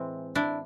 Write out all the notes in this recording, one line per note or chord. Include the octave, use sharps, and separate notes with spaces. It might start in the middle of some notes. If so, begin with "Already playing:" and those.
Already playing: A2 E3 G#3 C4
D4 E4